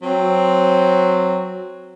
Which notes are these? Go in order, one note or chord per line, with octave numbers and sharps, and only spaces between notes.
F#3 C4